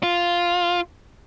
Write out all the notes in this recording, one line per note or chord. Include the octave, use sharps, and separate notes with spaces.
F4